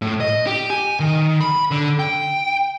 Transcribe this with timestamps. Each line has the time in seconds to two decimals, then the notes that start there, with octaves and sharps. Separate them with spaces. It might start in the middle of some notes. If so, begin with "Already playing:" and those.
0.02 A2
0.20 D#5
0.47 G4
0.70 G#5
1.00 D#3
1.41 B5
1.71 D3
1.99 G5